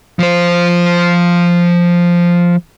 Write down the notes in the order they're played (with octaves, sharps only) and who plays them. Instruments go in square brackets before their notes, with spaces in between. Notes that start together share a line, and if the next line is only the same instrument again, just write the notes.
[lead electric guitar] F3 C5